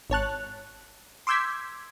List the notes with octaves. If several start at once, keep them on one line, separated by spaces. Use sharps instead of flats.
G#1 C#5 A5 F#6
C6 D6 E6 G6 G#6 B6